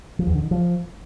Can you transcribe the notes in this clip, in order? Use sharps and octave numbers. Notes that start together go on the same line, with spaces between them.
F3
E2
D3
D#3
F3